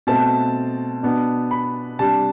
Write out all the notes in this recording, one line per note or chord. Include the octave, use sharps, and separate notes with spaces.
B2 A3 C4 A5
B2 B3 D4
B5
C3 G3 D4 A5